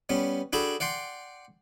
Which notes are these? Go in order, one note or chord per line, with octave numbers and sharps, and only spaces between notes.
G3 B3 C#4
D4 F#4 G#4 A4 G5 B5
D5 F#5 G5 C6